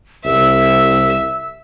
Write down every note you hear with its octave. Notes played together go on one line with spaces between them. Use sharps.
C2 E5 E6